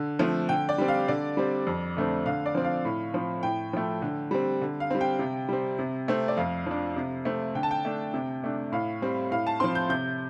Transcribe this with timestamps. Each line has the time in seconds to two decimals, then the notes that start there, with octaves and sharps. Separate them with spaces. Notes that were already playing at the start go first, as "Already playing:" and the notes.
Already playing: D3
0.19 F3 A3 C4
0.49 D3 G5
0.69 D5
0.78 G3 C4
0.88 F5
1.08 D3 D5
1.37 G3 C4
1.67 F2
1.97 D3 A3 C4
2.26 D3 F5
2.46 D5
2.55 F3 C4
2.64 F5
2.85 A2
3.14 F3 C4
3.43 A2 G5
3.73 F3 A3
4.02 D3
4.31 G3 C4
4.62 D3
4.80 F5
4.90 G3 C4
5.01 G5
5.19 C3
5.49 G3 C4
5.79 C3
6.08 A3 C4
6.28 D5
6.37 F2 F5
6.66 F3 D4
6.96 C3
7.25 A3 C4
7.55 D3 G5
7.63 A5
7.71 G5
7.85 A3 D4
8.14 C3
8.44 A3 D4
8.72 A2 F5
9.02 G3 C4
9.31 A2 F5
9.47 A5
9.60 F3 C4 C6
9.75 G6
9.89 C3 G6